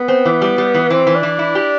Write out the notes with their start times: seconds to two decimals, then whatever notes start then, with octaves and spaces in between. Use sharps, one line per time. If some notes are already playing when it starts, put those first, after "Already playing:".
Already playing: B3
0.08 C4
0.25 E3
0.42 G3
0.58 G3
0.74 E3
0.90 E3 C4
1.07 E3
1.15 D4
1.23 E3
1.39 E4
1.55 G4